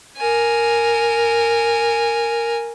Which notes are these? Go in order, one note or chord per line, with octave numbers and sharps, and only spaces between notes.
A#4 G#5